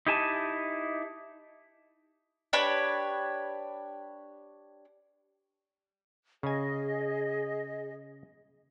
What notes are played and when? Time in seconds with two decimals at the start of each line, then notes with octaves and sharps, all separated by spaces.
0.07 D#4 E4 G4 G#5 A5
2.53 D4 G4 B4 C#5
6.43 C#3 G#4 D#5 G#5